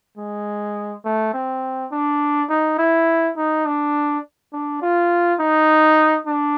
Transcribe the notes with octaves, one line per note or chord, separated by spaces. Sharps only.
G#3
A3
C4
D4
D#4
E4
D#4
D4
D4
F4
D#4
D4